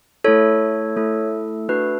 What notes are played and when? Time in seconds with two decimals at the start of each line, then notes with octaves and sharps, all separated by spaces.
0.24 A3 E4 A4 C#5
0.96 A3 E4 A4
1.69 A3 D4 F#4 A4 B4